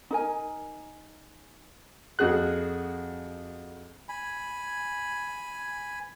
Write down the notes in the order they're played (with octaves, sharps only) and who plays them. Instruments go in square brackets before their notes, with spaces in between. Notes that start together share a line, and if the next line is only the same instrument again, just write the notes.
[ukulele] D#4 A#4 G#5
[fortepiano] F2 F#4 G#4 F#6
[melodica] G#5 B5